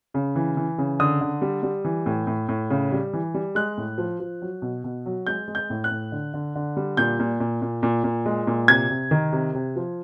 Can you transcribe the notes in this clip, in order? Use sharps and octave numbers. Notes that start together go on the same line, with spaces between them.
C#3
E3
E3
C#3
D3 D#6
D3
G3
G3
E3
A2
A2
A2
C#3
G3
E3
G3
G#3 F#6
A2
F3
F3
F#3
B2
B2
F#3
G#3 G6
G#3
G6
A2
F#6
A2
D3
D3
D3
G3
A#2 G6
A#2
A#2
A#2
A#2
A#2
G#3
A#2
C3 G#6
C3
D#3
C3
C3
F3